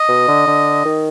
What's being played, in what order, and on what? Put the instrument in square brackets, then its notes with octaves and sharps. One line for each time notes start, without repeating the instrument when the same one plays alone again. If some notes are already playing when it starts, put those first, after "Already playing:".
Already playing: [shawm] D#5
[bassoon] B2
D3
D3
D#3